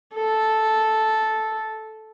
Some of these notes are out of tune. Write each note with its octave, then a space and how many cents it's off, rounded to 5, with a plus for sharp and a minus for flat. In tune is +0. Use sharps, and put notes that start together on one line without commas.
A4 -5